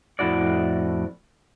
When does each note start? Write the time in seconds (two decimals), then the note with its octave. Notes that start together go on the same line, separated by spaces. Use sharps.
0.19 F2 A2 E4 F#4 D5